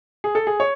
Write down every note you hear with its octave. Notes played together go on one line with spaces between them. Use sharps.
G#4
A4
G#4
C#5